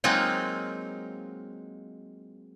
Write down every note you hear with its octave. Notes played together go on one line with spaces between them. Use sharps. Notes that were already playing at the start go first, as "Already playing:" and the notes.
F#3 G#3 A#3 C4 D#4 F4